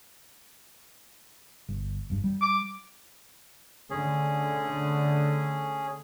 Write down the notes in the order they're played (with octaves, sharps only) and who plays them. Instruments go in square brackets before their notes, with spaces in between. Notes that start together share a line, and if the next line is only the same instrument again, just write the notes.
[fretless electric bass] G1
F#1 G2
G3
[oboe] D6
[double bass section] D3 A3 [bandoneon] C#4 G#4